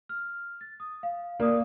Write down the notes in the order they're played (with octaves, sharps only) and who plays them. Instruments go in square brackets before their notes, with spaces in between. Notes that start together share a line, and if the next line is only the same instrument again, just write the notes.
[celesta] F6
A6
D#6
F5
[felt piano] A#3 [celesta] D5 F5 D#6